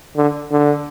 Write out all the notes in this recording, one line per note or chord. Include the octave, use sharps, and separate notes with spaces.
D3
D3